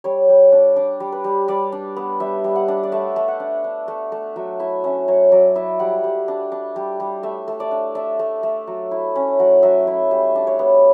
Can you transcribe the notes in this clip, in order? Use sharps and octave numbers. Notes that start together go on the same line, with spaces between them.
G3 C#5
G3
D4
D4 D5
G3
B4
G3
G3 D5
D4
B3
G3 E5
G3
F#5
D4
D5
A3 E5
A3
F#5
D4
D4
A3
A3
F#3 E5
E4 E5
C#4 E5
F#3 C#5
F#3 D5
E4 E5
G3 F#5
G3
D4
D4
G3
G3
A3 E5
A3
D5
D4
D4 E5
A3
A3
F#3
E4
C#4
F#3 F#5
F#3 E5
E4 E5
G3 E5
D4
C#5
B3